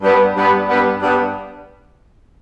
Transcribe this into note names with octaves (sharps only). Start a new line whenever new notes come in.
G2 G3 B3
G2 G3 B3
G2 G3 B3
G2 G3 B3